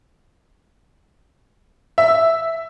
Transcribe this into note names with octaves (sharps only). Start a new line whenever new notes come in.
E5